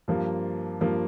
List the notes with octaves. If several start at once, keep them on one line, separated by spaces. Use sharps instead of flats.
G2 F3 A#3
G2 F3 A#3